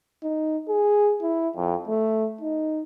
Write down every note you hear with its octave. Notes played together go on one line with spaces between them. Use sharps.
D#4
G#4
E4
F2
A3
D#4